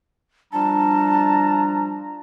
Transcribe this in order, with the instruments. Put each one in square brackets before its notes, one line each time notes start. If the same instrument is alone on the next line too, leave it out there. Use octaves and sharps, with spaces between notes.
[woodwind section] F3 G3 D4 [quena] A5 [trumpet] A#5